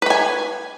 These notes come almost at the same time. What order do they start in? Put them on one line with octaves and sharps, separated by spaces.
B4 B5 G#5